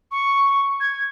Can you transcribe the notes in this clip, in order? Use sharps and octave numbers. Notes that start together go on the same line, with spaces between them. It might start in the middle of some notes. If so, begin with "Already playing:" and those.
C#6
G#6